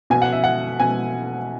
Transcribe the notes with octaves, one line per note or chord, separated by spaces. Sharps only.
B2 G#5
F#5
E5
F#5
B2 G#5